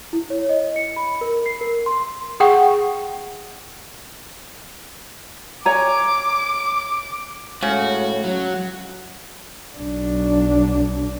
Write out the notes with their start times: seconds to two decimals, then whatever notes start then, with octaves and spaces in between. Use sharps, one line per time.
0.13 E4
0.30 C#5
0.49 D#5
0.76 C#7
0.96 B5
1.21 A#4
1.46 C7
1.61 A#4
1.86 C6
2.40 G#4 F#5 G5 C#6
5.65 C#5 G#5 A#5 D6
7.63 A2 C#3 G#3 F#4
8.24 F#3 C#4 F#4 F#5
9.76 B1 D4